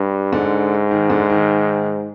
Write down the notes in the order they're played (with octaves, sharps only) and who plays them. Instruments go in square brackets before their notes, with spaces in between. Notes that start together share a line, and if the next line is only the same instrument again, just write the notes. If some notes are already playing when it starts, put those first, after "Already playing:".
Already playing: [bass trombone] G2
[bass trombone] G#2 [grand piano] D3
[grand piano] D#3
D3
D#3